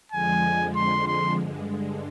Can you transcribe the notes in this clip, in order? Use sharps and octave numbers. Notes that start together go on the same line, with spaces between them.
F2 D3 F3 G#3 G#5
C6
C6
G2 D3 G#3